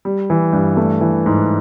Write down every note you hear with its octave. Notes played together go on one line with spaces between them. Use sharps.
G3
E3
G2
A3
E3
G#2